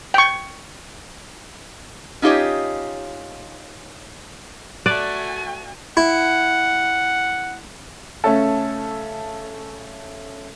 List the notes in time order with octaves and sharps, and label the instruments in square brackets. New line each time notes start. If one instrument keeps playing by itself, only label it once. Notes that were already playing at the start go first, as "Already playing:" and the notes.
[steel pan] G5 C#6
[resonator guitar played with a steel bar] C#4 D#4 F4 G4 C#5 D#5
[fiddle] A3 [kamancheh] F#4 G#5 [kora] D5 [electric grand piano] F#6
[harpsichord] E4 [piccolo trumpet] F#5
[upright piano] C#3 A3 C#4 A4